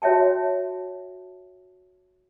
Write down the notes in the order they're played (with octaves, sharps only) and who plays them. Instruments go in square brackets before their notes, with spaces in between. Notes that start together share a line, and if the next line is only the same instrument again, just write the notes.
[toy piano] F#4 C#5 E5 G5 A5